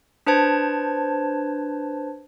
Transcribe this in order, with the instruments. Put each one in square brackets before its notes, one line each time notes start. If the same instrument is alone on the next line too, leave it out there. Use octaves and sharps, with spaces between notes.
[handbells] D4 B4 C5 A5 G#6